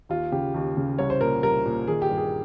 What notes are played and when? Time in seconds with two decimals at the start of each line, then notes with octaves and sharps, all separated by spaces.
0.09 D#2 F4
0.32 C#3 G4
0.54 D#2
0.77 C#3
0.98 C2 C#5
1.10 C5
1.21 A#2 A#4
1.43 C2 A#4
1.65 A#2
1.87 D#3 G#4
2.02 G4
2.10 G2
2.17 G#4